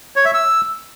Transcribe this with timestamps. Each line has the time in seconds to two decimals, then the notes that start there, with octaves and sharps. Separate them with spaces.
0.16 C#5
0.25 E5
0.34 E6